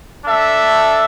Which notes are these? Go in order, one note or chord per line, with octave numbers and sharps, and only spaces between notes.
D4 A4 E5